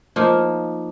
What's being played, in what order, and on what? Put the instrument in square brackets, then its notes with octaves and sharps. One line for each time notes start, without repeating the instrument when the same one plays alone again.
[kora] F3 A#3 D#4